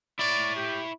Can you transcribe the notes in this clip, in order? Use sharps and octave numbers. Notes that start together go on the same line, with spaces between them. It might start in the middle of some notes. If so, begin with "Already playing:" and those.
E4 C#5 D5
G4